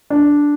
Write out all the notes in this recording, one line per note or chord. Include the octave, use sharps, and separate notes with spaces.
D4